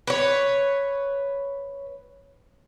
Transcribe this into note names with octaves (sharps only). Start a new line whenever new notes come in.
B4 C#5